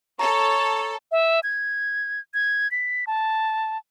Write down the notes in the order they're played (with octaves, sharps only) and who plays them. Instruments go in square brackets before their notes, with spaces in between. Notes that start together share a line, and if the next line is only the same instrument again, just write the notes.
[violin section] A4 [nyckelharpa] C#5 [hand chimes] A#5
[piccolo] E5
G#6
G#6
B6
A5